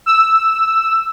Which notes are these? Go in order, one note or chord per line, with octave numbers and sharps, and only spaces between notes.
E6